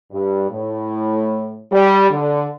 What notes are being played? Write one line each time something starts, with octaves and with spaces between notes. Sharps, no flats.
G2
A2
G3
D3